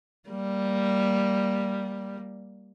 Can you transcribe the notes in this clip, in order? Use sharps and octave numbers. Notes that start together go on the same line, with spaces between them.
G3 A#3